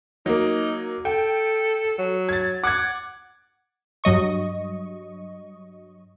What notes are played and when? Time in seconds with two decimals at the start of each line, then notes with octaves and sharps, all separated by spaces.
0.26 F#3 A#3 D#4
1.05 A4 G5
1.99 F#3
2.29 G#6 A6
2.64 F#5 D6 G#6
4.04 G2 F#3 D#5 C#6